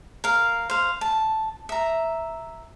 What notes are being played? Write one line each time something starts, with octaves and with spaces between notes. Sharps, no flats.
A#4 F5
C5 F5
A5
E5 A#5